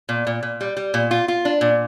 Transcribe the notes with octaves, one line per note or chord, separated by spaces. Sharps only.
A#2
A#2
A#2
G3
G3
A#2
F4
F4
D4
A#2